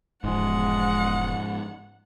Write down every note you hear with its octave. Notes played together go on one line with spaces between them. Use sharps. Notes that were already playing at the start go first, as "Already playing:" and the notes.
E1 G#2 F3 G#3 F#5